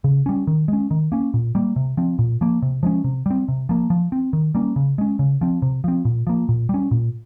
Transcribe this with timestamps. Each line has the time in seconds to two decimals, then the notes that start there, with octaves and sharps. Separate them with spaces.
0.04 C#3
0.26 G3 C#4
0.47 D#3
0.68 G#3 C#4
0.91 D#3
1.12 A#3 C#4
1.34 A#2
1.55 G3 A#3
1.76 C3
1.97 F3 C4
2.19 A#2
2.41 F3 A#3
2.62 C3
2.83 F3 G#3 C#4
3.04 C3
3.26 G3 C4
3.48 C3
3.69 F3 A#3
3.90 F3
4.12 C4
4.33 D#3
4.55 G3 A#3 C#4
4.76 C#3
4.98 G#3 C#4
5.19 C#3
5.41 F3 C4
5.62 C3
5.84 F3 C4
6.05 A#2
6.27 F3 A#3
6.49 A#2
6.69 G3 C#4
6.91 A#2